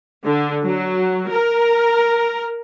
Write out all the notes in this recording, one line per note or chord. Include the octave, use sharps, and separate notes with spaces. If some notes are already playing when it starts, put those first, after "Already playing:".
D3
F#3
A#4